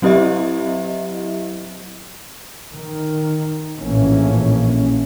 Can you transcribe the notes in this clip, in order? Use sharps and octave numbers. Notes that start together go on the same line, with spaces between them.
F#3 C4 E4 G4 D#5 E5
D#3
A#1 A2 E3 A#3 C#4